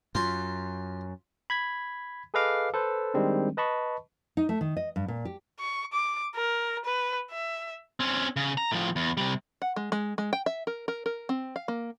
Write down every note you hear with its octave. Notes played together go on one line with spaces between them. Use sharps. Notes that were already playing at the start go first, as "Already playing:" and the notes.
F#2 F4 C6
B5 G#6 B6
G#4 A4 B4 D#5 F5 D6
A4 B4 C5
D#3 G3 G#3 C4 D4
B4 D#5 A5 B5 C#6
D#4
A3
D#3
D#5
G2
A#2
G4
C#6
D6
A#4
B4
E5
C4 C#4
C#3
A#5
A2 F3
E2
C3 G3
F#5
G#3
G#3
G#3
G5
E5
A#4
A#4
A#4
C4
F5
A#3